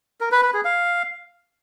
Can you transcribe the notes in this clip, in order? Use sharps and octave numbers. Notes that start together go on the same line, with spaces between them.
A#4
B4
B4
G#4
F5